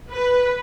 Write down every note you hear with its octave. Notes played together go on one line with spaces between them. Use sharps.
B4